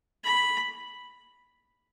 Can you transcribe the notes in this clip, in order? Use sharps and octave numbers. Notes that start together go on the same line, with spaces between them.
B5